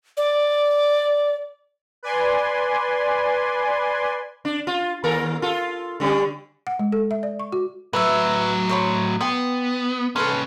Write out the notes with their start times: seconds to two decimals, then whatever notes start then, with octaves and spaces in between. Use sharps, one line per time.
0.17 D5
2.03 B4 D5 G#5 C6
4.45 D4
4.67 F4
5.04 D#2 A4 A#4
5.42 F4 A4
6.00 D3 G3 C#4
6.67 F#5
6.79 G#3
6.92 A4
7.11 E5
7.23 D5
7.40 C#6
7.52 F#4
7.93 A2 F#3 B4 E5
8.69 C5 C#5 B5
9.21 B3 G5 C6
10.16 C2 C#4 A4 B4 C6